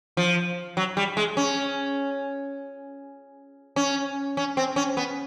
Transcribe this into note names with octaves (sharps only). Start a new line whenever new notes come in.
F3
F#3
G3
G#3
C#4
C#4
C#4
C4
C#4
B3